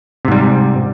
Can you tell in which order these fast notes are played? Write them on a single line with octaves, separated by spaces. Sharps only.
C3 G#2 G3